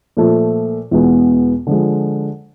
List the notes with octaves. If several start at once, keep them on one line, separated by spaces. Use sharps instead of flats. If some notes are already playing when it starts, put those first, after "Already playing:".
A#2 F3 A3
E2 B2 G#3 B3
D3 F3 G#3